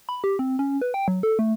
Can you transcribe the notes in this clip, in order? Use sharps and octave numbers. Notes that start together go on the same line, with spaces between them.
B5
G4
C4
C#4
B4
G5
F#3
A4
A3